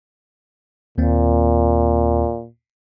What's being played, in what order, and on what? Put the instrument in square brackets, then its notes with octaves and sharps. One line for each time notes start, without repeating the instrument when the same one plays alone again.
[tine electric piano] D#2 A#3 C4 [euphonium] A#2